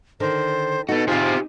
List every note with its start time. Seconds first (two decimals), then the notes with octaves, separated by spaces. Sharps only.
0.20 D3 D#3 C5
0.89 B3 D#4 F#4 A4
1.08 C4 F4 G4 G#4 C5